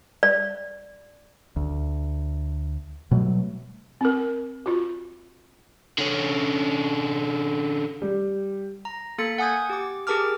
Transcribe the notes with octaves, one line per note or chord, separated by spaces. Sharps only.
D5
D2
B2 F#3 G3 A3
C4 A#4
F4 F#4
D3 C#4
G3
A#5
A#3 A4 A6 C#7
F#5 G#5 D#6 G6 G#6
G4 D6
G4 G#4 A#4 A5 D6 F6